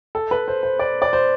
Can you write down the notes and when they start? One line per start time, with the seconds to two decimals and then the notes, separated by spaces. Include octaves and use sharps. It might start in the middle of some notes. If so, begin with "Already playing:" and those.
0.15 A4
0.31 B4
0.48 C5
0.63 C5
0.79 D5
1.02 D5
1.13 C5